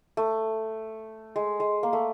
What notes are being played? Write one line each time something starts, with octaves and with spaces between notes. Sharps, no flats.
A3
G#3
G#3
A#3
A3